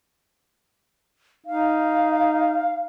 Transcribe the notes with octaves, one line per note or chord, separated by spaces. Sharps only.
D#4 F5